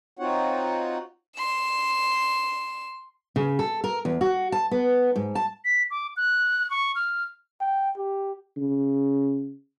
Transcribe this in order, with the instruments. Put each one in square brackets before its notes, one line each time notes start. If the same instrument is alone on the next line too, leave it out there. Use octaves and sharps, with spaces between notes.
[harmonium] C4 D#4 F4 F#4 C#5 F#5
[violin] C6 E7
[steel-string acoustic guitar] C#3
A4
A#4
E2
F#4
A5
B3
G#2
A5
[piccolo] B6
D6
F#6
C#6
F6
[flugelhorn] G5
G4
[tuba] C#3